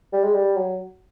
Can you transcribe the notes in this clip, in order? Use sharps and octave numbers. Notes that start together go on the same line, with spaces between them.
G3
G#3
G3
F#3